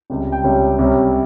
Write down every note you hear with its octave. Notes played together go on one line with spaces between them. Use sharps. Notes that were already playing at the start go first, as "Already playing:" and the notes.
C#2 C3 G3
G5
C#2 C3 G3 C#5
C2 C3 G3 C#4